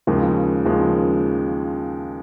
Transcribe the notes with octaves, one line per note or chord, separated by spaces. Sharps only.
D#2 C#3 F3 G#3
D#2 C#3 F3 G#3